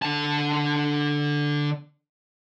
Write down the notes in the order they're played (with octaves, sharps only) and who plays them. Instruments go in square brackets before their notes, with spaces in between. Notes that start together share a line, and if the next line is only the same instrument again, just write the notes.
[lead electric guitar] D3 A5